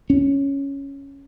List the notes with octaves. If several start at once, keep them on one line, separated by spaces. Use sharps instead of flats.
C#4